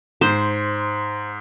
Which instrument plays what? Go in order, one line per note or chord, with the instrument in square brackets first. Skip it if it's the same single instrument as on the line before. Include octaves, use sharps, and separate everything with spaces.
[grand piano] G#2 [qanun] C5